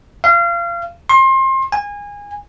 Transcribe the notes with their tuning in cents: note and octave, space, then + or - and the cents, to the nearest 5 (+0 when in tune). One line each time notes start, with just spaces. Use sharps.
F5 -30
C6 +30
G#5 -25